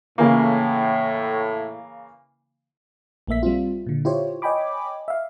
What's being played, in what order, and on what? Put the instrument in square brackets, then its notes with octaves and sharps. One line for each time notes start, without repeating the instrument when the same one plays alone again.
[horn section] A2 [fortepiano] C#3 E3 A#3
[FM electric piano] A#1 A3 A#3 E5 B6
G3 C4 F4
A#2 D3
E4 F4 G4 C5 C#5
C#5 D#5 G5 G#5 B5 D6
E5 F5